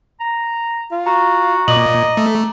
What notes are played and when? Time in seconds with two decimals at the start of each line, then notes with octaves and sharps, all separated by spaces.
0.20 A#5
0.91 F4
1.06 F#4 A#5
1.68 A#2 D#5 D6 F#7
2.17 A3